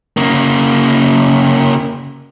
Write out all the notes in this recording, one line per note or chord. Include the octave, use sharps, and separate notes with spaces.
C#3 A#3